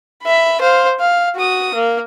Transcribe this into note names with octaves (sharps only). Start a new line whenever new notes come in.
E5 B5
C5 F5
F5
F#4 D#6
A#3